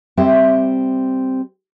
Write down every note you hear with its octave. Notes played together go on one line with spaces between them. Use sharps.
G3 C4 G4 E5